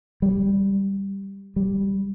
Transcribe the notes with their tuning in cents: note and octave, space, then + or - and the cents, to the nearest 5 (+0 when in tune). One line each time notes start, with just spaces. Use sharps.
G3 +5
G3 +0